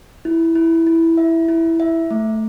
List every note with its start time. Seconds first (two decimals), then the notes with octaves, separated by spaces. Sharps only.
0.25 E4
0.55 E4
0.87 E4
1.17 E5
1.48 E4
1.80 E5
2.11 A3